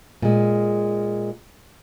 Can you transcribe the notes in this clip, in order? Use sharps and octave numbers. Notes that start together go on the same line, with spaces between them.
A#2 G#3